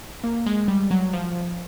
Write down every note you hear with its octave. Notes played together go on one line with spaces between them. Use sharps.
A#3
G#3
G3
F#3
F3